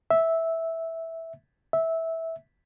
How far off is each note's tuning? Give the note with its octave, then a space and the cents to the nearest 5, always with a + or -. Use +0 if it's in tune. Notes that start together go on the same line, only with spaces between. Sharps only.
E5 -10
E5 -15